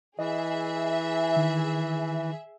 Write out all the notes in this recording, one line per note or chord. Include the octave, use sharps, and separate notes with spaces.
E3 G#4 D#5 E5
D#3